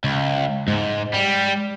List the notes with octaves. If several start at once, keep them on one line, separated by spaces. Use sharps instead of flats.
C#2
G#2 G#3
G3